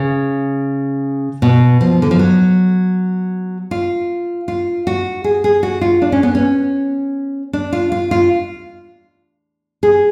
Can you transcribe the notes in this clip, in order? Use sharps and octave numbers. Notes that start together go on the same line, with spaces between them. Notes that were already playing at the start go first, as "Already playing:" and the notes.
Already playing: C#3
B2
F3
D3
F3
F#3
F4
F4
F#4
G#4
G#4
F#4
F4
D4
C#4
B3
C#4
D4
F4
F4
F4
G#4